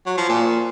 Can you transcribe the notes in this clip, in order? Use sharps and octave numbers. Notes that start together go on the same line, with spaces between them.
F#3
F3
A#2